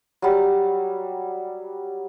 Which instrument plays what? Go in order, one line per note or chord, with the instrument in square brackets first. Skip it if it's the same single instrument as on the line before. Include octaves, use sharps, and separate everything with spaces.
[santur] F#3 G3